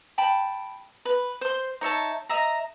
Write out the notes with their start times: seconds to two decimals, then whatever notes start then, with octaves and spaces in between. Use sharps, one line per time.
0.18 G5 A5 B5
1.05 B4
1.41 C5 C6
1.81 D#4 C#5 E5 A5
2.29 D#5 E5 A#5